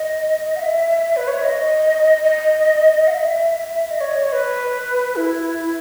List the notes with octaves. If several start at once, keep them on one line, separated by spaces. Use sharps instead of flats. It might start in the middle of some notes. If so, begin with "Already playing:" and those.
Already playing: D#5
F#5
E5
B4
C#5
E5
D#5
D#5
F#5
E5
D#5
C#5
D#5
C#5
B4
E4